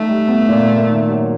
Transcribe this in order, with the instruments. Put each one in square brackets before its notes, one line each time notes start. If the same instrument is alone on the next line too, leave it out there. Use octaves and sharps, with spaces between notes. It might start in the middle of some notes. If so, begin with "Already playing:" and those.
Already playing: [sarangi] A3 [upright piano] D#4
[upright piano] G3
B3
A#2
A#3
D#3
F#3